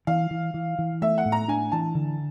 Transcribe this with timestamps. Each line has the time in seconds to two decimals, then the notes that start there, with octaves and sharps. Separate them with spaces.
0.07 E3 F5
0.31 E3
0.54 E3
0.78 E3
1.02 A3 E5
1.18 F#5
1.25 A2
1.32 A#5
1.48 D4 G#5
1.72 E3 A5
1.95 D3